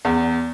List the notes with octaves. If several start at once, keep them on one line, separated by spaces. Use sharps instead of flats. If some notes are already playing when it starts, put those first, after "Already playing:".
E2